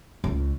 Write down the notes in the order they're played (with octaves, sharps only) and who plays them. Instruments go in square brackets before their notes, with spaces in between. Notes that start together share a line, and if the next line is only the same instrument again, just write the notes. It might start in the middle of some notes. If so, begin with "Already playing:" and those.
[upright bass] C#2